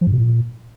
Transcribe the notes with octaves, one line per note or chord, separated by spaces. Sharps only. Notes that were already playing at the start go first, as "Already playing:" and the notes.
F3
G2
B2
A#2